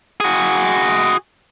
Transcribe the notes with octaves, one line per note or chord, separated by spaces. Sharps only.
F#4 G#4